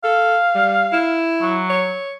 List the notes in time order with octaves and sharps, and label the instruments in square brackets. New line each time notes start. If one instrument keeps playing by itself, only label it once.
[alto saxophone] A4 [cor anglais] F5
[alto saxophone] G3
E4
[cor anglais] F#3
[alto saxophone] C#5